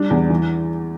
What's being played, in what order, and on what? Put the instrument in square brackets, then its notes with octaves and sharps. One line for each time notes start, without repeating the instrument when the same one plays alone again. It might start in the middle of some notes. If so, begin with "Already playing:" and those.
Already playing: [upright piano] G3 D4
E2
E3